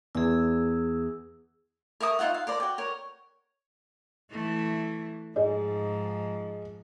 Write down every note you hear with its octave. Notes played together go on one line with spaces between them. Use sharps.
E2 G#4 E6
A#4 E5 C#6 D#6
D#4 F4 E5 F#5
F5
A#4 C5 D5
F#4 G5
A#4 C#5
E3 A3
G#2 F3 G#4 D#5